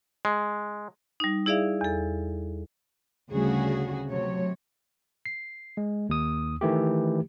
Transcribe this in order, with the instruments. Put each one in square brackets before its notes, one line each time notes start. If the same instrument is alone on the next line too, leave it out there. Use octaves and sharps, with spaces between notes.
[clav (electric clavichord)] G#3
[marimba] G3 D#4
E4 G#4 D5 E5 F5
E2 A4
[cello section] D2 C#3 G3 C#4 F#4 G#4
C3 F#3 A3 C#5
[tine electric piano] C7
G#3
D#2 D#6
D#3 E3 A3 G4